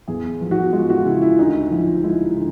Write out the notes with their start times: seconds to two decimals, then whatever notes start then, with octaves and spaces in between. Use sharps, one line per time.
0.08 E2 G#4
0.41 F3
0.51 F#4
0.73 G#3 F4
0.90 F#4
0.99 F4
1.05 C#3 E4
1.22 E4
1.38 D2 D#4
1.71 F3 E4
2.03 G#3 E4
2.36 D3